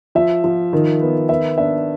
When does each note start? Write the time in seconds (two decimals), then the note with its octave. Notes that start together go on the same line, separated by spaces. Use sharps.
0.15 F3 E5
0.44 F3
0.73 D#3
1.01 B3
1.29 B3 E5
1.58 D4 E5